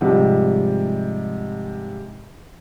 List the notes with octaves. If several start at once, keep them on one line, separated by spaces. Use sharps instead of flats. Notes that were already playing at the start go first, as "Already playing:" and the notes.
G#2 C3 F3 G3